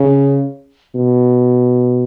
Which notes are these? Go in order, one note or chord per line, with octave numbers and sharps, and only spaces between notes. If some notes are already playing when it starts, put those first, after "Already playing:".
Already playing: C#3
B2